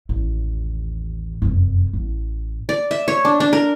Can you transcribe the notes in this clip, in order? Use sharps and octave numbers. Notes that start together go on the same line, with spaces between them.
A1 D#2
F1 F#2
A1
D5
E5
C#5
D4
D4
A#4